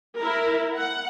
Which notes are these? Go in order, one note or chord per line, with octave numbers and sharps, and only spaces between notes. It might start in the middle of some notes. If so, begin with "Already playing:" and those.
E4 A#4
F#5